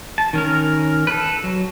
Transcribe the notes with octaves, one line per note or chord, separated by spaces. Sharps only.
A5
D#3 C#4 A#4
A4 B4
F#3